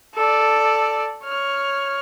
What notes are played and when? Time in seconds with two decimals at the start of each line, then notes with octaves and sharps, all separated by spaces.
0.15 A4 D5
1.24 C#5 F6